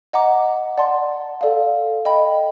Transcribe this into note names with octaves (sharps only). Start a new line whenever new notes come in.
D#5 F#5 A#5 D6
D5 F#5 A5 C6
A4 D5 F5
D#5 G5 B5